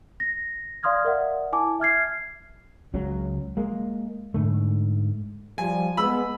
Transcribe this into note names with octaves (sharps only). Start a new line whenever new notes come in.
A#6
D5 F5 C6 D#6 F6 G#6
A#4 D5 E5 F#5
E4 G#5 A5 D6
E5 F6 G#6 C7
C#2 C#3 F#3
G#3 A#3
G#2 D3 A3
F3 G3 G#5
G#3 B3 B5 E6